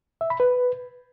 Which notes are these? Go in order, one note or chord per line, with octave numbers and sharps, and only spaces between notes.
E5
B5
B4